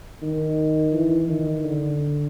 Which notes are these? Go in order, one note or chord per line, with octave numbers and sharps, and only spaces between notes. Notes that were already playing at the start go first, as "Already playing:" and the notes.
D#3
E3
D#3
D3